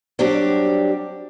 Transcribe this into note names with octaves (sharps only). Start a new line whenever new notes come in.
F#3 G3 C4 D4 G4